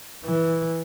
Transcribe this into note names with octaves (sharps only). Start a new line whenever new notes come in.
E3